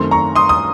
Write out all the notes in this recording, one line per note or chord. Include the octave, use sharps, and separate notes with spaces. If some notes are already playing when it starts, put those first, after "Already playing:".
Already playing: F#2 D#3 A3 C4 C6
A#5 C#6
C6 D#6
D#6